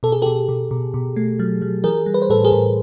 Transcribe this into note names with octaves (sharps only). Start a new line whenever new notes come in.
B2 A4
G#4
B2 G4 A4
B2
B2
B2
A3
F#3
F#3
E3 G#4 A#4
G3
B4
C5
A2 A4 B4
G#4 A#4
A2